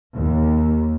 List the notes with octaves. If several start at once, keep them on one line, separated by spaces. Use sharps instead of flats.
D#2